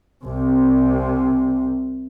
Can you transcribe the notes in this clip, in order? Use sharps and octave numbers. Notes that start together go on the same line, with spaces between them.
C2 C3